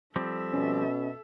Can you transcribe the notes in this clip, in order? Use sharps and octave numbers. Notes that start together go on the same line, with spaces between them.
F3 G3 C4 A4 E5
B2 C#4